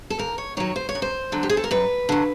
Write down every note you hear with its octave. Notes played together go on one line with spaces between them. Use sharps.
A4
D#2 A#4
C#5
D#3 F#3 C#5
C5
C#5
F#2
C5
D3 F#3
G4
G#4
A4
A#4
F#2 B4
D3 F#3